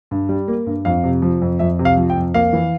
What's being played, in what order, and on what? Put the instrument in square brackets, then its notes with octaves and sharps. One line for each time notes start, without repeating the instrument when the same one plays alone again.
[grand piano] G2
G3
A#3
G2
F2 F5
C3
F3
F2
F2 E5
C3
F5
F3
G5
F2
A#3 F5
E3